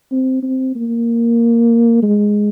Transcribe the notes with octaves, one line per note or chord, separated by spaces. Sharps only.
C4
C4
A#3
G#3